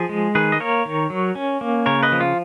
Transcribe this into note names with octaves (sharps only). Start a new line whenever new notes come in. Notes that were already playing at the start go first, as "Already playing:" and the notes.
Already playing: F3 G#4
G#3
D#3 G#4 B4
D#5
A#3 A#4 C#5
D#3
F#3
C#4
A#3
C#3 A#4 C#5
B4 D#5
F3
F4